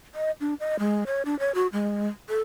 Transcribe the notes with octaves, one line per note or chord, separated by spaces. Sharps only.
D#5
D4
D#5
G#3
C#5
D4
C#5
F#4
G#3
A4